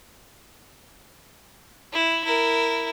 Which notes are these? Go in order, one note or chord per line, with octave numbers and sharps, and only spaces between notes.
E4
E4 A#4